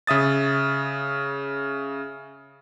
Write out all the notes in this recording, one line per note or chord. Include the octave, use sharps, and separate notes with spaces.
C#3 E5 D#6 A6